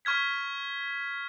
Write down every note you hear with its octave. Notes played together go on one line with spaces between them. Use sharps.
C#6 F6 G#6 B6